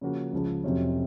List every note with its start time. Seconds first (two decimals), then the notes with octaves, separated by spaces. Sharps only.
0.01 C#3 F3 A#3 C#4 F#4
0.32 C#2 C#3 F3
0.64 F1 F2 C3 F#3 C#4